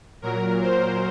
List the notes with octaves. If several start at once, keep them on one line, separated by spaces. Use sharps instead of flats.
A#2 F#3 A#4
C5